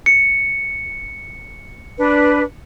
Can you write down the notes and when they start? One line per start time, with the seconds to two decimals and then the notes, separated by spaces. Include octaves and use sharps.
0.06 C#7
1.98 D4 B4